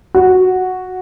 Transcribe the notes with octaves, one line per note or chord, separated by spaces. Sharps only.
F#4